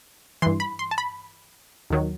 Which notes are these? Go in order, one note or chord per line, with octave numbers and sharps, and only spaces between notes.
G2 E3 C6
B5
C6
A5
B5
D#2 D#3 F#3